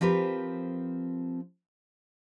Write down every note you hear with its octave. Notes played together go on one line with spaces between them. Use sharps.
F3 C4 G4 A#4 B4